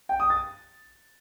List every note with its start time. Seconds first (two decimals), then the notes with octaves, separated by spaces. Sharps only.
0.09 G5
0.20 D#6
0.30 A6